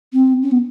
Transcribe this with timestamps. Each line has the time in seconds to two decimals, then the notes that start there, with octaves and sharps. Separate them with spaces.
0.13 C4
0.42 C#4
0.51 B3